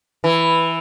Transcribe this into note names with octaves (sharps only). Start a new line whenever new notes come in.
E3